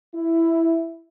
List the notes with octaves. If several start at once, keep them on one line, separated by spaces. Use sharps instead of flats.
E4